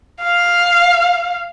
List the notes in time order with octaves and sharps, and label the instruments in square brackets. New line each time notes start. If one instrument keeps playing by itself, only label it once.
[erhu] F5